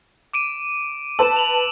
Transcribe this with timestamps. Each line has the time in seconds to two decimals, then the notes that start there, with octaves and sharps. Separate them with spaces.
0.33 D6 D7 D#7
1.19 B4 A5 E6 E7
1.36 F7 F#7